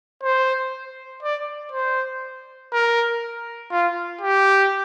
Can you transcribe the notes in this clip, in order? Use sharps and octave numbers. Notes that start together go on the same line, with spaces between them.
C5
D5
C5
A#4
F4
G4